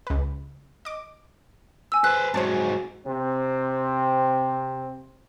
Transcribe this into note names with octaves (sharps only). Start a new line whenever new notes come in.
C#2 B4
D#5 D6
G#5 E6
B4 C5 F#6
G#2 F#3 C5 C#5 A5
C3 C4